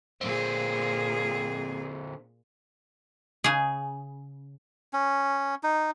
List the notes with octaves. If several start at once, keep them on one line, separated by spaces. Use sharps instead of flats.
A#2 D3 C4 G#4
C#3 G#4
C#4
D#4